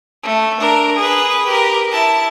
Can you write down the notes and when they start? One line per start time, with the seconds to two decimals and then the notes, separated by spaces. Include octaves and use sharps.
0.23 A3
0.60 D4 A#4
0.96 G#4 B4
1.46 G4 A#4
1.91 E4 A5